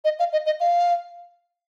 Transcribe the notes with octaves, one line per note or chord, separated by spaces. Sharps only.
D#5
F5
D#5
D#5
F5